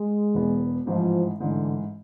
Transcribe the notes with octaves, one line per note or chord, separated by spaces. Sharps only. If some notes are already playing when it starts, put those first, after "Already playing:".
Already playing: G#3
E1 E2 B2 B3
A1 G#2 E3 F3
A1 G#2 D3 E3